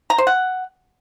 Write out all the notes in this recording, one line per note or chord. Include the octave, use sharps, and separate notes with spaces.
A#5
C5
F#5